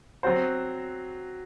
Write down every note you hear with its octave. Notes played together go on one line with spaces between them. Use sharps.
F#3 C4 F#4 C5